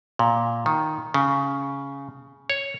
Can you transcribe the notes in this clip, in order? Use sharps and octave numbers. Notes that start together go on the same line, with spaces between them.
A#2
D#3
C#3
C#5